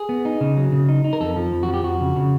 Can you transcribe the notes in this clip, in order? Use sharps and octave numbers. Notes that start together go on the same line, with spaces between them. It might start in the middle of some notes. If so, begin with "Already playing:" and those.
Already playing: G#4
B3
D#4
C#3
F#3
C#3
D#4
D#4
A#4
F2 A4
F3
F2
F#4
F3
G4
F2 F#4
C#3
C#3